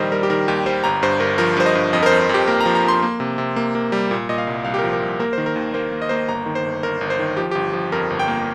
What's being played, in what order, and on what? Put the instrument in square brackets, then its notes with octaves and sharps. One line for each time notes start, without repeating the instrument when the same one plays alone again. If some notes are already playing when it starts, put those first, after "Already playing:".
Already playing: [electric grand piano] A#1 D#3 G3 A#4 C5 D#5
G3 A#4
G4
D#3 A#4
D#2 G4
G3 C5
G1 A#5
G2 C5
G1 A#4
F3 A#4
G2 C5
D#5
G2
F2 D#5
A#4
C5
F2
C5
F2 G4
A#3 A#4
A#5
F3
A#5
F2 C6
A#3
C3
C3
A#3
A#3
G3
A#2
A#2 D#5
F5
C2
C2 F5
G4
A#4
F3
A#4
C2
A#3 A#4
D#3 C5
A#4
D#2
A#3 C5
A#3
D#5
A#3 C5
D#5
G1 A#5
D#3
C5
G1
G1 A#4
G1
C5
D#3
F3 G4
G1 G4
F3
F2 A#4
G1
G5
A#3